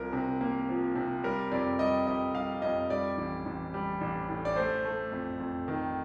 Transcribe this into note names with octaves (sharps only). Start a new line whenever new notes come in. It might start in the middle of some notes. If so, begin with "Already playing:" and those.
Already playing: C2 F3 A#4
C3
A#3
F3
C3
G3 A#4
F2 D5
G3 D#5
F2 D#5
G3 F5
F2 D#5
G3 D5
A1
A1
G3
A1
A2
D5
A3 C5
A3
F2
F2
D#3